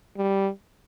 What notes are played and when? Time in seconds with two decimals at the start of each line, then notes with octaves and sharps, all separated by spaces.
0.17 G3